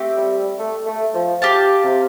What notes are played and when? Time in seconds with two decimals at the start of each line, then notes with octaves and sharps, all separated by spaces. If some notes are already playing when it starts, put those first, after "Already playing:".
Already playing: A3 C4 G4
0.18 G3
0.59 A3
0.86 A3
1.14 F3
1.42 G4 F5 A5
1.84 C3